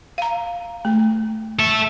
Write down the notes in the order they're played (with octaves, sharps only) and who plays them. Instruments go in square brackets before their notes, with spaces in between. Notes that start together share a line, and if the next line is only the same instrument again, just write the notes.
[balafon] F5 A#5
A3
[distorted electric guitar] A4 E5